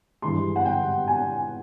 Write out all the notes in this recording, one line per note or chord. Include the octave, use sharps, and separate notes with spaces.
G2 E3 G#3 C6
F#5
G5
G#5